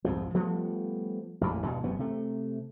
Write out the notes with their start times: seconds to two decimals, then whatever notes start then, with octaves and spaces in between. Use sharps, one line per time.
0.05 C2 F2 G#2 F3
0.34 F3 G3 A3 B3
1.41 A1 F2 A#2
1.63 E2 G2 B2
1.83 E1 F#2 C3 B3
1.99 C3 A3